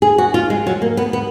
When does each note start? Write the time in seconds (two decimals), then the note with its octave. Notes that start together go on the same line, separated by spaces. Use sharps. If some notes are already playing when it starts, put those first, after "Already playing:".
0.02 G#4
0.18 F#4
0.34 F4
0.50 G#3
0.67 F#3
0.82 A#3
0.97 B3
1.13 B3